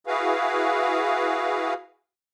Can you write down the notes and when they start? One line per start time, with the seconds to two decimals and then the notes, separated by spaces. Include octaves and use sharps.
0.07 E4 F#4 G#4 B4 F5